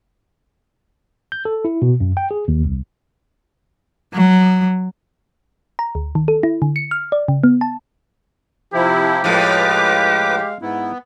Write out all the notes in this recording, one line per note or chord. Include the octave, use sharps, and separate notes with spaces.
G6
A4
E4
B2
F#2
G5
G#4
D#2
C2
F#3
A#5
D2
D#3
A4
E4
D3
C#7
F6
D5
C#3
B3
A5
C3 F3 E4 G4
A2 F3 G#3 B4 F5 D6
G#2 B3 E4